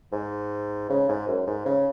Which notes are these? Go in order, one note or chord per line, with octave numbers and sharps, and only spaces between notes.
G#2
C#3
G#2
F#2
G#2
C#3